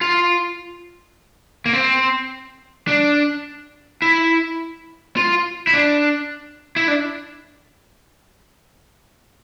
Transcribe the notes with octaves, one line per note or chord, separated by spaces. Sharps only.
F4
A#3
C4
D4
E4
F4
E4
D4
E4
D4